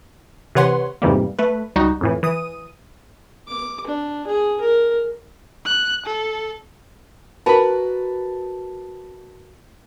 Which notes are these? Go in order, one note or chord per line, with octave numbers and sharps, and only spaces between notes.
C3 E3 B4 C#5 F#5 C6
F2 G#2 C3 E3 G3 A#3
A3 B4
C#2 G3 D#4 F#4
F2 A2 E3
E3 D#6 D#7
D6
D4
G#4
A#4
F#6
A4
F#4 A#4 B4 A5 B5